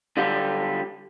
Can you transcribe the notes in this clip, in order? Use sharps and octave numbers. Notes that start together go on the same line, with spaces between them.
D3 F#3 G3 F4 G4